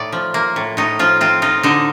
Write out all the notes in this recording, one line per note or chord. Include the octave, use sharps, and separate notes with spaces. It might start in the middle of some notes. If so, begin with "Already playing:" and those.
Already playing: A2 D#4 D5
F3
A#3
A2
A2 D#4
F3 F4
C4 F4
D#4 F4
D3 D#4